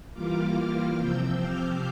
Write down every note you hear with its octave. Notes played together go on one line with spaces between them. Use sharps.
E3 G3 A#3 F4 D6 F6
C3 F3 C4 E6 G6
D6 F6